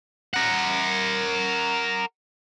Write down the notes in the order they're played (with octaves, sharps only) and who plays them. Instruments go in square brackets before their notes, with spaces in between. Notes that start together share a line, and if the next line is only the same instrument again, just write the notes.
[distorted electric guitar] A#4 F#5